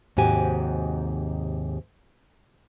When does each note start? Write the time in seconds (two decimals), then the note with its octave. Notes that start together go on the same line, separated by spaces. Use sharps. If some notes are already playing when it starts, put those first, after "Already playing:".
0.17 D#2 G#2 C3 F#4 G4 G#5